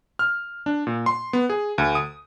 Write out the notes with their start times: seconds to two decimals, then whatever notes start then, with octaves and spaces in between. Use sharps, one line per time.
0.19 F6
0.66 D4
0.87 A#2
1.06 C6
1.33 B3
1.50 G#4
1.78 D2
1.95 D#6